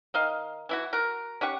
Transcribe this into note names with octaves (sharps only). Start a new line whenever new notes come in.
D#3 D#5 F5
E3 E4 F#4
F#4 A#4
C#4 G4 F#5 C#6